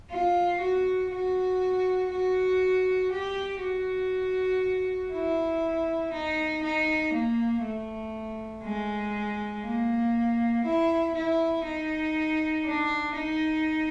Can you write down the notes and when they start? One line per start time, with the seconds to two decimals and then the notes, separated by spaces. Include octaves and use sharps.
0.10 F4
0.61 F#4
1.11 F#4
2.11 F#4
3.12 G4
3.62 F#4
5.12 E4
6.13 D#4
6.63 D#4
7.13 A#3
7.63 A3
8.64 G#3
9.64 A#3
10.65 E4
11.15 E4
11.65 D#4
12.66 D4
13.15 D#4